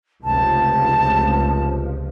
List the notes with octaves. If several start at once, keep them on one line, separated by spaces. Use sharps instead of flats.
F1 C#2 F3 A5